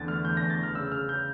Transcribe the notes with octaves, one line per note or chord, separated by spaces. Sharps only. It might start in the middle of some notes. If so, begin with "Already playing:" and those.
Already playing: E2 D3 A6
A3 F6
E2 G6
A#6
E2
A6
E2 F6
C#3 E6
C#3 F6
C#3 G6